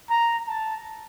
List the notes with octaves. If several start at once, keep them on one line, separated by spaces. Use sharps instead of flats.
A#5
A5